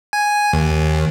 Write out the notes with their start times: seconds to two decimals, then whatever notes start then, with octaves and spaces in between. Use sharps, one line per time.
0.13 G#5
0.53 D#2